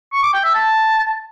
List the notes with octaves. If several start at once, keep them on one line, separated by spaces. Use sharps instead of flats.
C#6
D6
G5
E5
A5